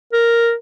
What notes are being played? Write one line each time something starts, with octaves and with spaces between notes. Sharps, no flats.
A#4